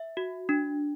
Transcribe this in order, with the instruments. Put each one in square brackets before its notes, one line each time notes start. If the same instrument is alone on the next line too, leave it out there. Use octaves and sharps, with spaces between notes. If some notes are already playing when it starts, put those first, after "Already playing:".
Already playing: [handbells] E5
F#4
D4